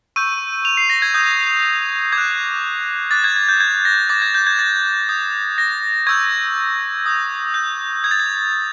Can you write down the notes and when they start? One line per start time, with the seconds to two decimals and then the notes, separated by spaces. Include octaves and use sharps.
0.16 C#6 E6 G6 D#7
0.65 F7
0.77 C7
0.90 A#6
1.02 G#6
1.14 D#6 G6
2.12 D6 G#6
2.18 F#6
3.11 D6 F#6 A6
3.24 G#6
3.36 G#6
3.49 G6
3.60 G#6
3.85 A#6
4.09 D6 G6 A6
4.22 G#6
4.34 G6
4.47 G#6
4.59 A6
5.09 D#6 G6
5.58 A#6
6.07 C#6 E6 G6 G#6
7.06 D#6 G6
7.54 G6
8.04 D#6 G6 G#6
8.11 A6
8.20 G#6